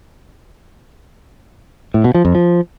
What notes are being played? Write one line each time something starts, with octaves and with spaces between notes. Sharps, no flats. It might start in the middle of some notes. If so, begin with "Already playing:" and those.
A2
B2
F3
F2
F3